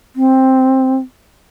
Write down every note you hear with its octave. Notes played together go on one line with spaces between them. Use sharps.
C4